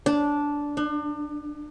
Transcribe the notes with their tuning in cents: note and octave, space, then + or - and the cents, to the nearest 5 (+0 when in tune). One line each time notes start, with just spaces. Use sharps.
D4 -10
D4 +35